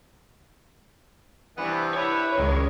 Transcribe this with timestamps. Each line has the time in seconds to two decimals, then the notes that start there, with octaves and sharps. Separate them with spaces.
1.58 G2 C3 E3 B3
1.94 E4 B4 C#5 E5
2.37 C#2 F#2 D#3 G#3